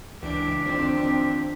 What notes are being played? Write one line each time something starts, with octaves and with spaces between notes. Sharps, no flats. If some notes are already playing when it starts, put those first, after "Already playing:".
C#2 E3 D4 G4 D7
F2 D#3 C4 D4